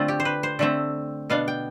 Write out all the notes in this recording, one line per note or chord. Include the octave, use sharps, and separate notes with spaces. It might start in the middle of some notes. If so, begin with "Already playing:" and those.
Already playing: D3 A3 C4 F4
G4
C5
B4
C5
D3 A3 C4 E5
B2 B3 D4 F5
G5